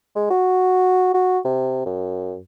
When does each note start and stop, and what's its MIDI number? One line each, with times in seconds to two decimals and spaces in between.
0.16 0.30 56
0.30 1.14 66
1.14 1.39 66
1.45 1.83 48
1.86 2.39 42